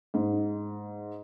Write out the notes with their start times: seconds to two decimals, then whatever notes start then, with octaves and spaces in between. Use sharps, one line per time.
0.14 G#2